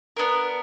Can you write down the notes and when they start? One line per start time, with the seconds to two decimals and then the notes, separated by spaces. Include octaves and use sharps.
0.17 B3 D4 A#4